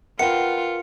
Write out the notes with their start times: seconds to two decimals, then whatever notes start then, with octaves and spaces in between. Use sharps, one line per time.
0.19 F4 A#4 B4 F#5 G5 C#7